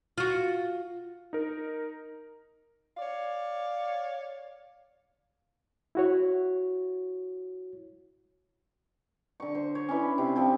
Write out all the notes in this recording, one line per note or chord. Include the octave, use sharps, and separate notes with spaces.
F4 F#4
D#4 A#4
C#5 D5 F5
E4 F#4 C#5
D3 C#6
C5
C#5
C#4 D4 E4 B4
C3 C6
F3 C4 A4 G#5